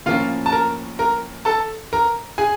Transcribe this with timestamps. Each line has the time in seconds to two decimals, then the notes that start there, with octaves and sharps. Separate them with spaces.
0.06 A2 F3 A#3 C#4 F4 F5
0.46 A5
0.52 A#4 A#5
0.99 A#4 A#5
1.45 A4 A5
1.93 A#4 A#5
2.38 G#4 G#5